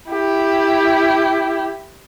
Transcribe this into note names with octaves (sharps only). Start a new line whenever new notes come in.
E4 G4